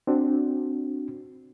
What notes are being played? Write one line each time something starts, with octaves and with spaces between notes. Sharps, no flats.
C4 D4 F#4